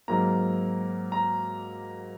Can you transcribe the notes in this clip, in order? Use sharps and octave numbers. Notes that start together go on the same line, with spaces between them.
G#2 F#3 A#3 A#5
A#5